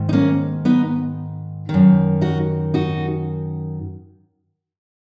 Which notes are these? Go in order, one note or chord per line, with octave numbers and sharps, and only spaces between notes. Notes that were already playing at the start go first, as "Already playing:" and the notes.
Already playing: G#2 D#3
D#4
A#3 C#4
B3 D#4
D#3
F#2
D#4 F#4
D#4 F#4